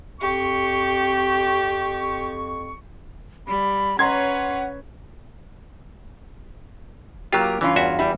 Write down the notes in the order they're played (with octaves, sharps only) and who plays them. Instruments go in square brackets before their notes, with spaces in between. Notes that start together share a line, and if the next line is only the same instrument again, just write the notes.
[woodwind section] F2 C#6 [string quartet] G4
[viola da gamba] G3 [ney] B5
[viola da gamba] C#4 B4 C#5 [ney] F#5 [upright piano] A#5 C6 G#6
[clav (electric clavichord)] F#3 F4 [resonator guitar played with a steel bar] A#3 G4
[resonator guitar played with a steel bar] G2 C#4 F4 [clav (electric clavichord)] E3
[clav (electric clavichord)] E2 F#4 E5
[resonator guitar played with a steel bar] G3 E4